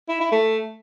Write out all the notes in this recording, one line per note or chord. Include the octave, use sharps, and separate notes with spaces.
E4
E4
A3